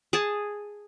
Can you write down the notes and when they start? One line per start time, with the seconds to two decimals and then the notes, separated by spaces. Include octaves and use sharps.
0.13 G#4 A5